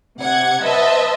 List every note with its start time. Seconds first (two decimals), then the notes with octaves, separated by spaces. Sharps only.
0.19 C3 F#5 G#6
0.62 B4 C5 D#5 E5 A5